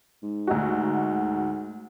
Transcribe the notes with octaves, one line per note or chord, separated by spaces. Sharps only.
G#2
D2 D#4 F#4